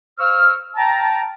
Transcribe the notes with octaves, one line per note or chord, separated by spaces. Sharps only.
C5 F5 C#6 E6 F6
G5 A5 A#5